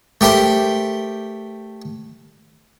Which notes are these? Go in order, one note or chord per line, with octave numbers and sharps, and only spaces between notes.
A3 G4 A#4 C5 C6